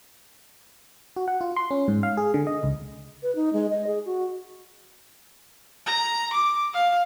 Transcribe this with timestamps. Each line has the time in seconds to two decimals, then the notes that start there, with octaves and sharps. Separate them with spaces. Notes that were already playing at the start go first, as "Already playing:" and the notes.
1.16 F#4
1.28 F#5
1.41 F4
1.56 C6
1.71 C#4
1.88 G#2
2.03 F5
2.17 G#4
2.34 D3
2.47 D#5
2.63 C#2
3.23 B4
3.35 D#4
3.53 G#3
3.70 D#5
3.87 G#4
4.06 F#4
5.87 A#5
6.33 D6
6.74 F5